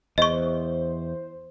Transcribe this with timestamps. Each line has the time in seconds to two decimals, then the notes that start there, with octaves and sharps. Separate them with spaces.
0.18 E2 C5 D#5 C#6